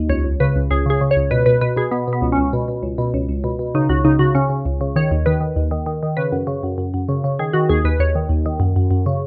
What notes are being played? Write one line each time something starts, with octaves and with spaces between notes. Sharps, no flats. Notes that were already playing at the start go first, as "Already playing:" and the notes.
Already playing: D#2
C#2 C#5
C#2
C#3 B4
C#2
C#2 G#4
C#3 G#4
C#3
C#5
C#2
B2 B4
B2 B4
B2 B4
B2 G#4
B2 B3
B2
B3
C#2
C#4
C#2
B2
B2
C#2
B2
C#2
C#2
B2
B2
C#3 D#4
C#2 F#4
C#3 D#4
C#3 F#4
C#3 C#4
C#3
C#2
C#3
D#3 C#5
D#2
D#3 B4
D#3
D#2
D#3
D#3
D#3
C#3 B4
F#2
C#3
F#2
F#2
F#2
C#3
C#3
D#3 G#4
D#3 F#4
D#2 G#4
D#2 B4
D#2 C#5
D#3
D#2
D#3
F#2
F#2
F#2
C#3